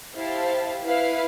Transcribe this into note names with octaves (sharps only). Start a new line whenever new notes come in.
E4 G4 C5 F5 A5
E4 B4 F5